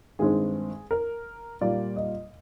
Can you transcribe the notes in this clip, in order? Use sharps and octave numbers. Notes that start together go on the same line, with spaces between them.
G2 D#3 G#3 C4 G#4
A#4
A#2 G3 A#3 D5
D#5